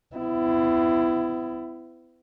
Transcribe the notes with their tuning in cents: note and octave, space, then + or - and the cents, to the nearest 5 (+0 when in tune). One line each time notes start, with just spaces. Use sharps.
B3 +45 E4 +15